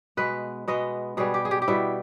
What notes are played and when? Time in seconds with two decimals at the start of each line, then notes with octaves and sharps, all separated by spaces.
0.17 B2 G#3 B3 B4
0.68 B2 G#3 B3 D#5
1.17 B2 G3 B3 G#4
1.34 G4
1.45 G#4
1.51 G4
1.62 G4
1.68 B2 G3 B3 E4